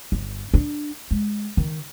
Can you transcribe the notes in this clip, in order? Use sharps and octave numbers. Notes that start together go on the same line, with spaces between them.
G1
D4
G#3
D#3